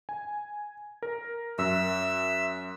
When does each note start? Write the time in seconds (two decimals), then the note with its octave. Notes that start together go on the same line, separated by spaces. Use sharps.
0.09 G#5
1.02 A#4
1.58 F#2 E5 E6